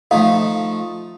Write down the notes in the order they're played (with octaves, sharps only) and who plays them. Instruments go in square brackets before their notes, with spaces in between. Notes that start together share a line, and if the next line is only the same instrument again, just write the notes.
[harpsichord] F3 A3 D#4 [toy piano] F5